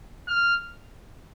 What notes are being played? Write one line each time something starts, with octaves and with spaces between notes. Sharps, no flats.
F6